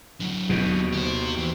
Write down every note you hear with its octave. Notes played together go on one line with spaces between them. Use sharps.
D3 F#3
D#2 B2
G4 C5
E3